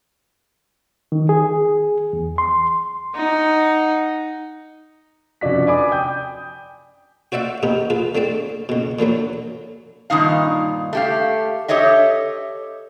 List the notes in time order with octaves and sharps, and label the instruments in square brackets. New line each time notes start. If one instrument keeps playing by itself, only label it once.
[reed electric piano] D#3
G#4
E2
C6
[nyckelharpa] D#4 F#5
[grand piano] F1 F#2 F3 D4 F#4 B6
D5 G#5 B5 D6 D#6
G5 D#6 G6
[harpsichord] F#4 C5 D5 E5 F#5
C3 B3 D#4 G4
F4 G#4 B4
D3 A3 C4 D5
C#2 B2
A#2 D3 E3 F#3
[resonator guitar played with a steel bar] G2 A#2 D#3 D#4 F5
A3 G4 F5
G4 A4 C#5 D#5 E5